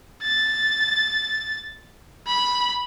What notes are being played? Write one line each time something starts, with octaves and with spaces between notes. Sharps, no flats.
A6
B5